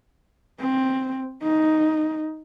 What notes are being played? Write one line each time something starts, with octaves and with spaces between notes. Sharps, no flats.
C4
D#4